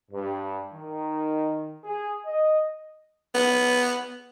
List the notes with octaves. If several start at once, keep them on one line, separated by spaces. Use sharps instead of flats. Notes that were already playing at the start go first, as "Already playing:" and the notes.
G2
D#3
G#4
D#5
B3